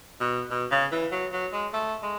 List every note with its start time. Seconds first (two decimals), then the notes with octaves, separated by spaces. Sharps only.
0.20 B2
0.51 B2
0.71 C#3
0.92 E3
1.12 F#3
1.32 F#3
1.53 G#3
1.73 A3
2.03 G#3